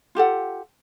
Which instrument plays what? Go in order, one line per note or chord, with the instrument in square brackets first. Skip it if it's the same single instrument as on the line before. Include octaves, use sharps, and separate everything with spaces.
[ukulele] F4 G4 A4 F#5